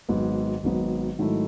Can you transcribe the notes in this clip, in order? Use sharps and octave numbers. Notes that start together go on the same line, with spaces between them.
G#1 G#2 F#3 B3
G#1 G#2 F#3 B3
G#2 D#3 F#3 A3 E4